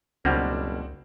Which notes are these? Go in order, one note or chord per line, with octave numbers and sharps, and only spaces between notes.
F#1 C#2 B2 G3 A#3 C4 D4 F#4